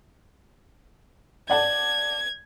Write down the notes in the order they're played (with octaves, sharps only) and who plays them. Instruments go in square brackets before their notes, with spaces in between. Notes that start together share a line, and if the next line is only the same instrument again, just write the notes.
[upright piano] D5 F#5 A5 [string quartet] G#6